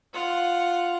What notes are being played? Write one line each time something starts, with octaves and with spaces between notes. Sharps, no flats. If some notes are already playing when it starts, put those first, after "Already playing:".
F4 F#5